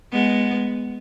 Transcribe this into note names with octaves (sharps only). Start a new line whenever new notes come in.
G#3 B3